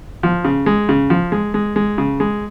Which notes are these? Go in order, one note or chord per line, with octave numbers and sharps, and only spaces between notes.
F3
C#3
G#3
C#3
F3
G#3
G#3
G#3
C#3
G#3